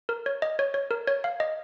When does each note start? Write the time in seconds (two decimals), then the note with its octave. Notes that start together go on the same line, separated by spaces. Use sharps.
0.09 A#4
0.26 C#5
0.42 D#5
0.59 C#5
0.74 C#5
0.91 A#4
1.07 C#5
1.24 F5
1.40 D#5